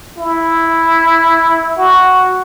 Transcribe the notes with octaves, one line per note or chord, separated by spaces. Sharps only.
E4
F#4